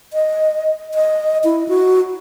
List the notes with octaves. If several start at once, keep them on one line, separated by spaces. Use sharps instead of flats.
D#5
D#5
E4
F#4